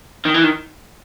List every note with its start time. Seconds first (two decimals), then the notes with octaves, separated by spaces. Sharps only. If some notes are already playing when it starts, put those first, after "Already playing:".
0.26 D#3
0.35 E3
0.44 D#3